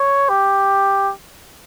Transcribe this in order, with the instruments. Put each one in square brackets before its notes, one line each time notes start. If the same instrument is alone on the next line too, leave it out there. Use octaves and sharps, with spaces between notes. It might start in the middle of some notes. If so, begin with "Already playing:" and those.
Already playing: [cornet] C#5
G4